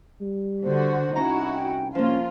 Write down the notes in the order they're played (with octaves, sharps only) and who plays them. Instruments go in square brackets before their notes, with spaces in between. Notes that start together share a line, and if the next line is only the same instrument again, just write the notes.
[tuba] G3
[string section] D3 F#4 [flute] C5
[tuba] C2 [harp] C#4 A#5 [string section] D#4 E4 F#4
[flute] G5
[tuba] C2 [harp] F3 A#3 [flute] C#4 [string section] F4